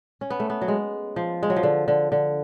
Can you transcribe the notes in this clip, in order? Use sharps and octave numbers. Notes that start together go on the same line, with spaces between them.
C#4
B3
A3
B3
F#3
G#3
F3
G#3
F#3
F3
D3
D3
D3